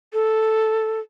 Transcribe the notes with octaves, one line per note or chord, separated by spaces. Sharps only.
A4